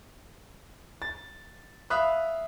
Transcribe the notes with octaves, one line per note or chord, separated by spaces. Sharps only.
A6
E5 F5 B5 D#6 F#6